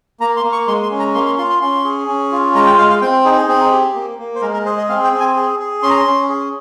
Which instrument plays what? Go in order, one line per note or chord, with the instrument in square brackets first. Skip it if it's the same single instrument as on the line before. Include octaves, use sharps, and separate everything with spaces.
[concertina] A#3 A#5
C6
A#3
C#6
G#3 C6
C6
C#4
A#5
A#3 C6
C6
F4 C6
C6
C#4 C6
G#4
C#4
F4
G#3 A#5
G5
G#3 F5
F5
C4 G5
D#4 G#4
G#4
C4 G#4
G4
A#3
A#3
C5
G#3 A#4
A#4
G#4 C5
D#5
C4 F5
G5
C4
G#5
G#4
G#4
C#4 C6
A#5
C6
C#4
G#4